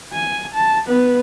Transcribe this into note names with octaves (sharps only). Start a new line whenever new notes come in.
G#5
A5
B3 B4